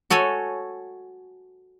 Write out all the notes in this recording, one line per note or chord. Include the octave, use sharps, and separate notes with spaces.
F#4 A4 C#5 G#5